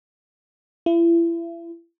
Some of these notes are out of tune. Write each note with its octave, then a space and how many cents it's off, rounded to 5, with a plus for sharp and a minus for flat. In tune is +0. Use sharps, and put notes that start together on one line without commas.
E4 +35